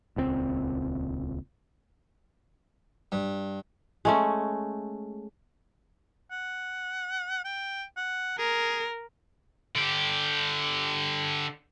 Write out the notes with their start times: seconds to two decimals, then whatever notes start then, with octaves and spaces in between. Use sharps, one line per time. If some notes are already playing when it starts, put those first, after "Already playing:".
0.16 D#1 C#2 D3 C4
3.12 G2
4.05 G#3 A3 C#4
6.32 F#5
7.44 G5
7.97 F#5
8.38 G#4 A#4
9.76 D3 G4